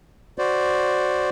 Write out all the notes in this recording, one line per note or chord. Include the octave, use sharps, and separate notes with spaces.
F#4 C5 D5